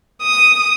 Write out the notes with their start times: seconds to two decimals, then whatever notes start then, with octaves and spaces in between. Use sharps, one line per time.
0.22 D#6